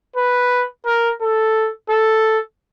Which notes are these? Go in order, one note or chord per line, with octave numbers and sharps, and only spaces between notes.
B4
A#4
A4
A4